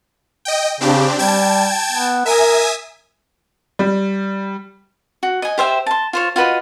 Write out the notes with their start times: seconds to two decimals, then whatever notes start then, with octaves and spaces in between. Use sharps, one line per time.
0.45 D#5 G5
0.81 C#3 C4 D4 G4
1.19 G3 G5 A5 G#6
1.92 B3
2.26 A#4 E5 G#5 D#6
3.79 G3
5.23 F#4
5.42 D#5 G#5
5.58 G4 C5 E5 G5
5.86 A5 C6
6.13 F4 C5 C#5
6.36 F4 F#4 B4 D#5